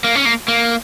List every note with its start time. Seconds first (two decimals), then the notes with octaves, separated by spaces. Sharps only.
0.04 A#3
0.15 C#4
0.25 A#3
0.48 A#3